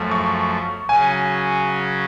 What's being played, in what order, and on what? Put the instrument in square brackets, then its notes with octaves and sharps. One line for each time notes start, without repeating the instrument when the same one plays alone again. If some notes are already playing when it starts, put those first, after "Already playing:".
Already playing: [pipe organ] F#2 F3 A3
[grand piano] C#6
[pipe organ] C#3 F#3 C#4 [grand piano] G#5